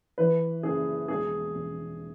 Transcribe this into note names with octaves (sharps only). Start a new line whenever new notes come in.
E3 B4
F#1 G#4
E1 G#4
E1